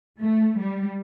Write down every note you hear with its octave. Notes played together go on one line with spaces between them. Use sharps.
A3
G3